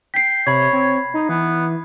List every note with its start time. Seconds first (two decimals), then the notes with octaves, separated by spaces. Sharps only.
0.14 G5 B6 C7
0.47 C3 C#5 B5 G#6
0.73 C4
1.14 D#4
1.29 E3 B3